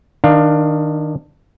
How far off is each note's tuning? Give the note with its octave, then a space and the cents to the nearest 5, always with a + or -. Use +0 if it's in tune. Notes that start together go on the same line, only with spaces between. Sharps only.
D#3 +0 D4 +20 F5 +0